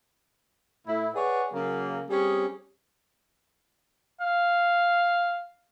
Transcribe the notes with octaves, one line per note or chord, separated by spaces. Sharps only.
A2 E4
G#4 B4 C#5 D5 F#5
C#3 F#3 A#3
G3 C4 C#4 G#4
F5